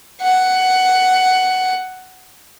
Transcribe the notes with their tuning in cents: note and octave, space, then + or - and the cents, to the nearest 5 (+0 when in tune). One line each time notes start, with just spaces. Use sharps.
F#5 +10